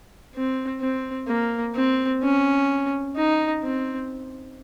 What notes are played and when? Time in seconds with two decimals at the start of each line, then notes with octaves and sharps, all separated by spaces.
0.35 C4
0.81 C4
1.28 A#3
1.75 C4
2.23 C#4
3.16 D#4
3.63 C4